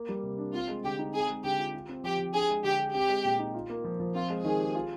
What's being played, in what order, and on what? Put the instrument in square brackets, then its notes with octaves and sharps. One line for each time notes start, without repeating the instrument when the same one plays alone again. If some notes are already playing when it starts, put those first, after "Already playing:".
Already playing: [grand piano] A#3
G3
C3
D4
[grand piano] C4 [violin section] F4
[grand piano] G#3
[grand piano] D3 [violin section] G4
[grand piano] D#4
[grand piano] C4 [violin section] G#4
[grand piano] G#3
[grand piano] D3 [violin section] G4
[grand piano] F4
F4
C4
[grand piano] F3 [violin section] G4
[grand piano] F3
[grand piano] D4 [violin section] G#4
[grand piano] G#3
[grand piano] D3 [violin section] G4
[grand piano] G#4
[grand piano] C4 [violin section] G4
[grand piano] G#3
A#2
D#4
F4
A#3
F3
F3
[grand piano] C4 [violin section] F4
[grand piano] G#3
[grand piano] D#3 [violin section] G#4
[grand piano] G4
F4